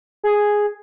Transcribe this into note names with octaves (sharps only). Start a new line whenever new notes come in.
G#4